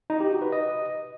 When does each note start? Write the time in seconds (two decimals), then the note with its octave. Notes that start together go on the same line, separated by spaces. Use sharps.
0.10 D#4
0.20 G4
0.31 F#4
0.42 B4
0.52 D#5